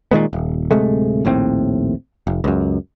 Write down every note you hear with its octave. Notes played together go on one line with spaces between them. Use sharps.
A#2 D#3 G#3 B3
D#1
D1 C3 G#3 A3
A#1 D#2 A2 C4
F1
C#2 F#2